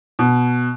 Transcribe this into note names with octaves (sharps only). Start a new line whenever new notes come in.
B2